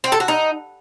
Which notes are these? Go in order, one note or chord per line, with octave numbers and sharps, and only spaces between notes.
C4
A4
F#4
D#4